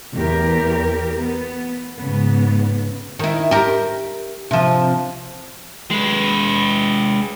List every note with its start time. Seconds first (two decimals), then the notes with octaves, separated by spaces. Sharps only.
0.16 E2 G4 A#4
1.18 B3
1.99 G#2 C#3 B3
3.19 D#3 E4
3.51 G4 A#4
4.51 C3 F3
5.91 G#3 B4